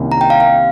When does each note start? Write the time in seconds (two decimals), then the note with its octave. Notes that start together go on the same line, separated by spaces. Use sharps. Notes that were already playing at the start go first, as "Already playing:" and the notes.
Already playing: C2 C3 D#3 A#3 C#4
0.12 A#5
0.21 G5
0.30 F5
0.40 F5